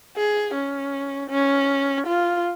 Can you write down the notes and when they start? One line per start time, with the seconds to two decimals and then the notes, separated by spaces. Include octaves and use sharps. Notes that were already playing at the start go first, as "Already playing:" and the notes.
0.16 G#4
0.54 C#4
1.30 C#4
2.06 F4